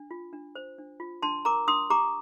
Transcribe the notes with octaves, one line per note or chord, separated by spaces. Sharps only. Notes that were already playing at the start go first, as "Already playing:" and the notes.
Already playing: D4
F4
D4
C5
D4
F4
D4 A5 C6
A#4 A#5 D6
D4 C6 D#6
G4 A#5 D6